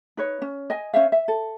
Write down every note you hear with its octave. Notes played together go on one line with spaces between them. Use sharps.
D#4 B4 C#5
C#4
D#5 G#5
C#4 C5 E5 F5
E5
A4